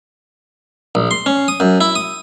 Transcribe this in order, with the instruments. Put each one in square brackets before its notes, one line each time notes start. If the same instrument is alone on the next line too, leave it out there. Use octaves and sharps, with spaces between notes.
[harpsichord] A#1
C6
C#4
D#6
F#2
E4
D#6